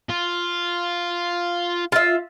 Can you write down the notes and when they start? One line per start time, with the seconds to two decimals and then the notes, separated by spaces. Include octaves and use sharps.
0.09 F4
1.92 F4 E5